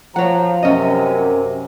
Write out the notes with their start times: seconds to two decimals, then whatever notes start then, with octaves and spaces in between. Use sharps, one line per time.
0.16 F3 C#5 F#5 A#5
0.63 F#2 C3 C#4 D#5